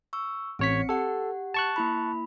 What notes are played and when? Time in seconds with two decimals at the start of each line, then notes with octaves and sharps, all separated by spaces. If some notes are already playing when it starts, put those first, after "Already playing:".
0.13 C#6 E6
0.59 A1 C4 C#5 B6 C#7
0.89 G4 A4 F#5
1.54 A5 C#6 F#6
1.76 A#3 E4 B5